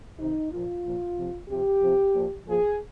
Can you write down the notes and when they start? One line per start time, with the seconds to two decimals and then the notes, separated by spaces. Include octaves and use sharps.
0.18 C3 D#3 D#4
0.51 A#2 F3 F4
0.85 A#2 F3
1.17 C3 F3
1.49 C3 F3 G4
1.81 C3 F3
2.14 A#2 F3
2.47 A#2 F3 G#4